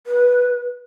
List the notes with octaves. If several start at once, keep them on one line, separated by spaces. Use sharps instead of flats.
B4